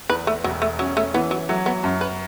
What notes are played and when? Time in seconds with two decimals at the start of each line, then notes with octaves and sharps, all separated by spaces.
0.09 E2 B4
0.27 A3
0.44 E1 F#3
0.62 A3
0.79 F#3 C#4
0.97 A3
1.14 E3 B3
1.31 F#3
1.49 F#3 A3
1.66 B3
1.84 F#2
2.01 B4